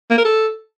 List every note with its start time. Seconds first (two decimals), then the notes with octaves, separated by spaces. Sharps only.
0.10 A#3
0.17 A#4
0.25 A4